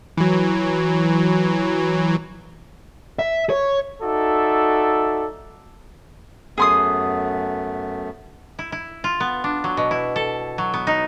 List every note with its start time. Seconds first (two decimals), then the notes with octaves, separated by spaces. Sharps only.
0.17 E3 F#3
3.19 E5
3.50 C#5
4.02 D#4 F#4 A4 D5 E5
6.58 F#2 A3 B3 G#4 C6 D#6
8.59 E4
8.72 E4
9.04 F4
9.20 B3
9.44 D4
9.64 F#3
9.77 B2
9.91 E4
10.16 A4
10.58 F#3
10.74 B3
10.87 D#4